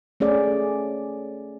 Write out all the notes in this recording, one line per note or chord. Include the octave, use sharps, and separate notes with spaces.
A3 C#4 G#4 D5